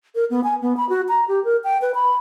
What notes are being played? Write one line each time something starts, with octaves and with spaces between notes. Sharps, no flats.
A#4
B3
G#5
B3
B5
F#4
A#5
G4
A#4
G5
B4
B5